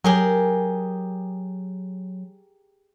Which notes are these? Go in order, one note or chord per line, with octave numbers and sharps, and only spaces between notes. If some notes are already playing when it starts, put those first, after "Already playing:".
F#3 G4 G#4 A#4